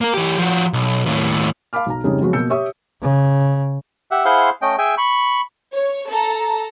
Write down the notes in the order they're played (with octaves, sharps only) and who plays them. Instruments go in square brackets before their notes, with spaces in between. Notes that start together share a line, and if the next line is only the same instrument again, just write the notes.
[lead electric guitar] A#3 A#4
E3 G4
F3 F#4
B1
D#2 A2
[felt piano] F5 A5 B5 D6 F6
B1 A#5
F2 G#2 C#3 G3 D#4
F3 F#3 G#3 B3 F4 F#4
B2 A#3 E6 G6 C#7
G4 C#5 E5 C#6 D#6
[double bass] C#3
[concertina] G4 E5 F#5
E4 G#4 C5 F5 F#5 C6
A3 C#4 D#5 G5
G#4 E5 G5 G#5
B5 C#6
[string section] C#5
A4 A#5